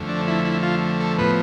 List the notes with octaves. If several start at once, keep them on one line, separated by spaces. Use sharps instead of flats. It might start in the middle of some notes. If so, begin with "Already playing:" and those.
Already playing: F2 D3 A3
D4
E4
E4
F4
A4
A2 F3 B3 B4